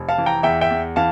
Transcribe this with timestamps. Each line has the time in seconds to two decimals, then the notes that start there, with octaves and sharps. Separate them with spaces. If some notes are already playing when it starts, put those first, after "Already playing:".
Already playing: F1
0.09 F5 A5
0.18 E3
0.26 G5 A#5
0.43 E2 E5 G5
0.61 E5 G5
0.70 E2
0.96 E3 F5 A5